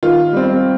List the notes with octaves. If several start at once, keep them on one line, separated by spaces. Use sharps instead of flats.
D#3 F4
G3 C4